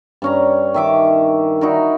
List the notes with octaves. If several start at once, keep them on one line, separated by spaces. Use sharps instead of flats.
G2 C#4 A#5
D#3 E5 D6
D#4 E4 F#4 A#4